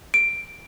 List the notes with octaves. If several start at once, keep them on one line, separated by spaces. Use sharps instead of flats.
D7